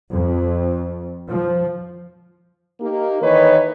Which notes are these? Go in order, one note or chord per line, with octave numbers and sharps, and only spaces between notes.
F2
F3
A#3 D#4 G4
D#3 E3 A#3 B4 C#5 D#5